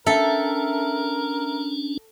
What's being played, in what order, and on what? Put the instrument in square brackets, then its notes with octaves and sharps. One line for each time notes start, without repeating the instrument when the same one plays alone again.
[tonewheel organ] C#4 D4 [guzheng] A4 [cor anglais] A#4 [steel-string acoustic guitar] E5 G5 A#5